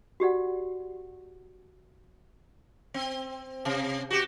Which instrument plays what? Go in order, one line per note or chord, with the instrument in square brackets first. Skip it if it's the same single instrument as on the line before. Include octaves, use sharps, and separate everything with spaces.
[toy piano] F#4 G4 D5 F#5
[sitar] C4
C3
F#4 G4